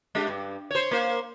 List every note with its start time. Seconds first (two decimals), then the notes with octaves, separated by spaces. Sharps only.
0.15 G#3 D4 G4
0.28 G2
0.71 C5 C#5
0.91 A#3 C5